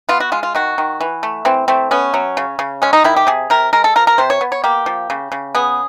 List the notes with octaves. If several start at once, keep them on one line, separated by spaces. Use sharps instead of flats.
B3 F4
F#4
G#3 F4
F4
D#3 F#4
D#3
E3
A3
E3 C4
A3 C4
B3 C#4
F#3
C#3
C#3
G#3 C#4
D#4
D#3 E4
G4
C3 G#4
C3 A#4
G#3 A#4
A4
F3 A#4
A#4
C3 C5
C#5
B3
C#5
A#3 G4
F3
C#3
C#3
B3 G#4